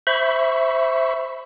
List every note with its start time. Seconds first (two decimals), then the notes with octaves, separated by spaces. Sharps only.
0.07 C5 E5 B5 C#6